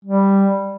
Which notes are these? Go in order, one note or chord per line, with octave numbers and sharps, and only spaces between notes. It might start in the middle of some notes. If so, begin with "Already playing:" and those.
G3